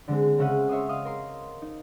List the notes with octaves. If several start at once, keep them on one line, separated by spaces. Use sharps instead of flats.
D3 G#3 C4
C#3 G#3 C#4 E5 F#5 D#7
C#5 E5 C6 D#6
D#5 F5 D#6
A#4 C6
D#4